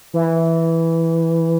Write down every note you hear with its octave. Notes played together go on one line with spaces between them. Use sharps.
E3